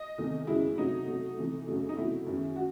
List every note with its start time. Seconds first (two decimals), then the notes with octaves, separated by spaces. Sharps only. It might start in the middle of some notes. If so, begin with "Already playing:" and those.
Already playing: D#5
0.18 E2 C3 D#3 A3
0.47 F#2 C#3 G#3 E4
0.77 C3 F#3 A3 D#4
1.07 C3 F#3 A3
1.38 C3 E3 A3
1.67 F#2 C#3 F#3 A3
1.89 D#4
1.97 E2 C3 F#3 A3 E4
2.27 F#2 D#3 G#3
2.56 F#4